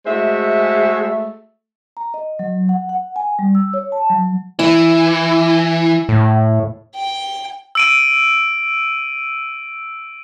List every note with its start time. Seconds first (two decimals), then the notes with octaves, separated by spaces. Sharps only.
0.06 G#3 A3 F#4 C5 E5
1.97 A#5
2.14 D#5
2.39 F#3
2.69 F#5
2.89 F#5
3.16 G#5
3.39 G3
3.55 E6
3.74 C#5
3.92 A5
4.10 F#3
4.59 E3 E4
6.09 A2
6.95 G5
7.75 E6 D7 D#7